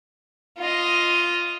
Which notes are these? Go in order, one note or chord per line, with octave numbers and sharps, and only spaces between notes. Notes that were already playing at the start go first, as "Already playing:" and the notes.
F4 D#5